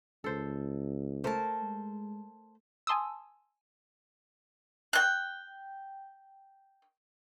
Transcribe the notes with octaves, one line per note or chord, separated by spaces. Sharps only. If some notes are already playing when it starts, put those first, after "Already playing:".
C#2 A4 C5
A3 A#4 C5 A5
G#3
G#5 A5 C6 D#6 E6
G5 F#6